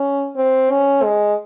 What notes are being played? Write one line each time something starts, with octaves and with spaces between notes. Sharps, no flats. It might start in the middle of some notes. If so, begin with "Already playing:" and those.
Already playing: C#4
C4
C#4
G#3